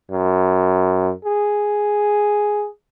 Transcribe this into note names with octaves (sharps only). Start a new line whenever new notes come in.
F#2
G#4